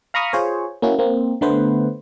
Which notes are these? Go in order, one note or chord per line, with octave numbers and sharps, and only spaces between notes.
F5 A#5 B5 C#6 D#6 F6
F4 G#4 C5 C#5
A#3 C#4 E4 F#4
A#3 C4
D3 A3 B3 B4 C5